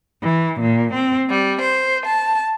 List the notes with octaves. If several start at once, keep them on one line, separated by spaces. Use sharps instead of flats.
E3
A#2
C4
G3
C5
A5